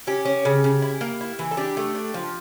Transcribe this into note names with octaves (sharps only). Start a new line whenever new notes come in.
C#4 G4
C#4
C#3
C#3
E4
A#3
E4
E3
A4
D4 G4
A3
D4
F3